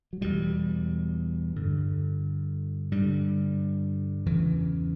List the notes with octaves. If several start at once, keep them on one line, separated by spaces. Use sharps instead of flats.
F#3
E2 B2 G3
G2 D3
G2 D3 G3
E2 C#3 E3